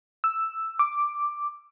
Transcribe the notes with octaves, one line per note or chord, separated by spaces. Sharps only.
E6
D6